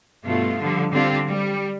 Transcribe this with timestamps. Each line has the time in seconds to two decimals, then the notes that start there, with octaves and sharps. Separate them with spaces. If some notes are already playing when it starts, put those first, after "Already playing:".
0.24 G2 B2 A3 F4
0.61 D3 F3 G3
0.92 D3 G3 C4 F4 G4
1.26 G3